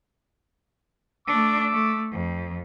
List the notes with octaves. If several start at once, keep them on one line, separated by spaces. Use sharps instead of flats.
A3 D4 D6 E6
A3
F2